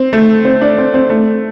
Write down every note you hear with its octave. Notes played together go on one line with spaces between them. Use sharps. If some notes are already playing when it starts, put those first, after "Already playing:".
Already playing: C4
A3
C4
D4
C4
C4
A3